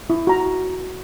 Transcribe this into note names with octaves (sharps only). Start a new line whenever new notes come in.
E4
F#4 A#5